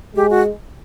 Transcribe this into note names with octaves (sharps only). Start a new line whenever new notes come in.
G#3 G4
F#4